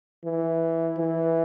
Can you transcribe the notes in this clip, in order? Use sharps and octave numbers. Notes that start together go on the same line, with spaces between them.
E3
E3